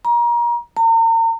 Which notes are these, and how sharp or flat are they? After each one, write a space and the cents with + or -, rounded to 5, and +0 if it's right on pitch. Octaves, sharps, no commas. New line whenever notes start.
A#5 +30
A#5 -40